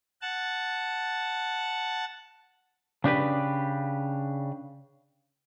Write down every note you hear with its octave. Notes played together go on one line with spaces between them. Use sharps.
F#5 A5
C#3 D4 G4 B4